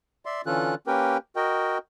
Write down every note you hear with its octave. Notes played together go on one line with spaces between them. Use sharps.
D5 E5 C6
D3 E3 C#4 F4 A4 F#6
A#3 C#4 G4 A#4 B4 G5
F#4 A#4 D#5 G5